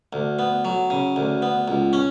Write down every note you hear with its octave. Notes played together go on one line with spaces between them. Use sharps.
D2
B3
F#3
C#3
D2
B3
C#2
C#4